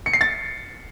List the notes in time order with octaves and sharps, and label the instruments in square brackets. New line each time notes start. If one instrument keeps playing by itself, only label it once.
[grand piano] C#7
C7
A6